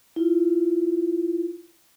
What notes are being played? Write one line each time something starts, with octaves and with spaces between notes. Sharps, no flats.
E4 F4